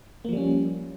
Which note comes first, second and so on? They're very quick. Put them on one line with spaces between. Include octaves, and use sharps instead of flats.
A#3 F3 G3 C#4